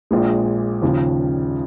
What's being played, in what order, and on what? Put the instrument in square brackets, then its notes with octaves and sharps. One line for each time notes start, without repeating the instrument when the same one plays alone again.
[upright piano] A#1 A#2 G#3
D#2 C#3 F3